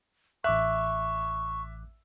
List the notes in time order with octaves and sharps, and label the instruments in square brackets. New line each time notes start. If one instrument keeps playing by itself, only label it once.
[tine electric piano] A1 D6 F#6 [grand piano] E5 [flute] C#6